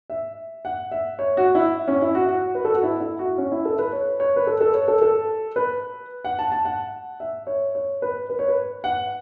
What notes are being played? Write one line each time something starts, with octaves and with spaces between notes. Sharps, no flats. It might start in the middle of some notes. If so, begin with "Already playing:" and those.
E5
F#5
E5
C#5
F#4
E4
C#4
E4
F#4
F#4
B4
A4
F#4
E4
E4
F#4
C#4
E4
A4
B4
C#5
C#5
B4
A4
A4
C#5
A4
A4
B4
F#5
A5
A5
F#5
E5
C#5
C#5
B4
B4
C#5
B4
F#5